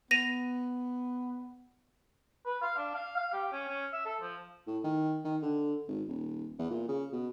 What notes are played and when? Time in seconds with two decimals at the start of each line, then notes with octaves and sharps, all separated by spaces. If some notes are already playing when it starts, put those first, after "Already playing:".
0.11 B3 A#6 D#7 F7
2.46 B4
2.62 F5
2.77 D4
2.95 F5
3.17 F5
3.33 G4
3.53 C#4
3.68 C#4
3.93 E5
4.05 A4
4.22 F3
4.67 A2
4.84 D#3
5.24 D#3
5.42 D3
5.88 G#1
6.08 D#1
6.58 E2
6.70 A#2
6.88 C#3
7.12 B2